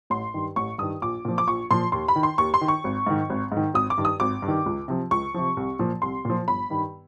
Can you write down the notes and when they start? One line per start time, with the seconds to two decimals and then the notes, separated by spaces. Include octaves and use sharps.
0.10 A1 C6
0.34 G2 D#3
0.56 A1 C#6
0.78 G2 D#3 D#6
1.02 A#1 D6
1.25 A#2 F3
1.38 D6
1.47 A#1 C#6
1.71 A#2 F3 C6
1.92 D#2 C6
2.08 B5
2.16 D#3
2.23 C6
2.38 D#2 C#6
2.54 C6
2.61 D#3
2.68 C#6
2.84 G#1
3.07 G#2 D#3
3.30 G#1
3.52 G#2 D#3
3.74 G#1 D#6
3.90 D6
3.98 G2 D#3
4.05 D#6
4.20 G#1 D6
4.42 G2
4.48 D#3
4.66 C#2
4.88 C3 F3
5.11 C#2 C#6
5.34 C3 F3
5.57 C2
5.79 A#2 F3
6.02 C2 C6
6.25 A#2 F3
6.47 G1 B5
6.70 G2 D#3